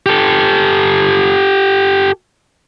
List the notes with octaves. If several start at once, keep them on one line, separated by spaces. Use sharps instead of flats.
G4 A4